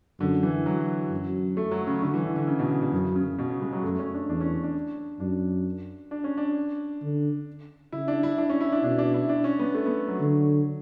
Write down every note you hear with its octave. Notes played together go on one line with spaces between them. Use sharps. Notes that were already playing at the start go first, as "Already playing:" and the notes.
F#2 D3
E3
F#3
F#2
A3
F#3
C#3
D3
E3
D3
D3
C#3
B2
C#3
B2
F#2 C#3
C#3
B2
C#3
G#3
F#3
F#2 A3
C#4
D4
E2 D4
C#4
D4
F#2 D4
D4
C#4
D4
D3
C#3 E4
D4
E4
D4
C#4
E4
D4
B2 D4
D4
E4
D4
C#4
B3
A3
B3
F#3
D3